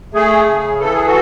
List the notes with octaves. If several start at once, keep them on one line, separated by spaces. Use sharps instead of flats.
A3 G#4
C#3
E3 A4
G#4
F#4 A4